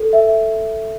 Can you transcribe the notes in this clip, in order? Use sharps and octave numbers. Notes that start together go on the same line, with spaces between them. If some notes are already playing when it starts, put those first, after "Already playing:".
Already playing: A4
E5